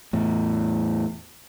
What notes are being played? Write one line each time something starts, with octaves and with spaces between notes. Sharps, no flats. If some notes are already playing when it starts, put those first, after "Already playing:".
E2 A2